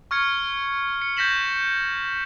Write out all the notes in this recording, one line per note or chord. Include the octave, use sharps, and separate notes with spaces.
C#6 F6 G#6 C#7
C#7
G6 G#6 A#6 B6 E7 F#7